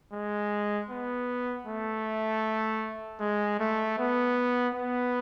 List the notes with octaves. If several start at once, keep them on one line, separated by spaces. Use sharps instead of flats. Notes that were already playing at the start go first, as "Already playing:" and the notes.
G#3
B3
A3
G#3
A3
B3
B3